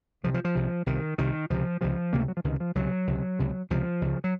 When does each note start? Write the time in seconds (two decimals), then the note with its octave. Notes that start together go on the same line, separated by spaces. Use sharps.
0.23 C2 C3 F3
0.34 F3
0.45 F3
0.55 C2 C3
0.86 C2 C3 D#3
1.18 C2 C3 D#3
1.50 C#2 C3 F3
1.81 C#2 C3 F3
2.13 C#2 C3 A#3
2.20 A3
2.28 F#3
2.37 F3
2.44 C#2 C3 D#3
2.60 F3
2.75 C#2 C3 F#3
3.07 C#2 C3
3.39 C#2 C3
3.70 C#2 C3 F3
4.01 C#2 C#3
4.24 F#3